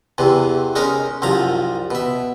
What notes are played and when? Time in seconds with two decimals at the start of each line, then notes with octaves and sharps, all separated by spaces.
0.18 E2 C3 E3
0.76 G#3 C#4 D#4 A#4
1.22 C2 F#2 F3 A#5
1.91 B2 E5